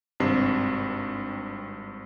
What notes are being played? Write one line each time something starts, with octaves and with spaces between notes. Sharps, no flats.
G#1 G2 C3 C4 C7